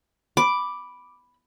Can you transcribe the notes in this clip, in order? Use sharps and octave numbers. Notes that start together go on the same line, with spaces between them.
B5 D6